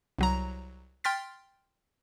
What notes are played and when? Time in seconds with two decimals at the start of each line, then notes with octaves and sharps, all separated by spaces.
0.19 C2 F#3 A#5
1.04 G5 C6 F6 A6 B6